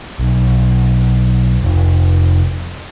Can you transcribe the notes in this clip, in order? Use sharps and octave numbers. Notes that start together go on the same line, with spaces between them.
B1
F1